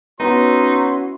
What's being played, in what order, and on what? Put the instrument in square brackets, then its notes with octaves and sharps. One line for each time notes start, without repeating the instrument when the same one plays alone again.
[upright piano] B3 [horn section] C#4 E4 F#4 [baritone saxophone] D#4 [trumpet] C6